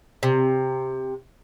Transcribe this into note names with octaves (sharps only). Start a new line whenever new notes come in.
C3